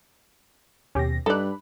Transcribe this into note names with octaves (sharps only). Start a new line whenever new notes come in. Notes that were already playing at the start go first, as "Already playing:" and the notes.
D#2 B2 C#4 G4 A#6
G2 D#4 A4 D5 B5 F#6